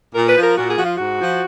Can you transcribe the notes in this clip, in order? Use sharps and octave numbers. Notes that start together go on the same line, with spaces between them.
A#2 A#4
B4
F3
A#4
A#2 F#4
G#4
F3 F#4
F4
G#2 F#4
F3